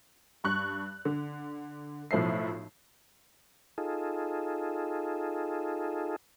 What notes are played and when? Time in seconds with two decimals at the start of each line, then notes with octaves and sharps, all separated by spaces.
0.44 G2 C#6 F#6
1.05 D3
2.11 B1 A2 F3 E5 C7
3.78 D#4 F4 G#4 A4